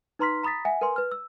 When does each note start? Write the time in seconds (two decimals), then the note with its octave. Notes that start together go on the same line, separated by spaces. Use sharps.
0.19 D#4 B4 A#5 C6 F6 B6
0.43 A#5 B5 D#6 A6 B6
0.65 E5 F#5 G#5
0.81 A#4 B4 G#5 C6
0.96 B4 F6
1.12 E6